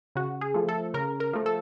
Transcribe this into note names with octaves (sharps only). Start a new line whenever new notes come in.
C#3 F#4
G#4
F3 A3
A4
C#3 A#4
A#4
F3 A3
A4